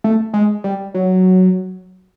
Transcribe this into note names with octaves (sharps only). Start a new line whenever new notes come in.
A3
G#3
G3
F#3